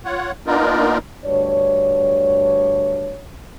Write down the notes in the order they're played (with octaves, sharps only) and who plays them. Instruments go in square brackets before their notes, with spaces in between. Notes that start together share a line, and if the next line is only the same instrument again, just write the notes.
[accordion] F4 C#5 F#5
A#3 B3 D4 D#4 F4 A#4
[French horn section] D2 G2 D4 C#5